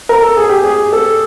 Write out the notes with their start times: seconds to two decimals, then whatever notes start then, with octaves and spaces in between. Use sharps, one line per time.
0.09 A#4
0.22 A4
0.37 G#4
0.49 G4
0.64 G#4
0.78 G#4
0.93 A4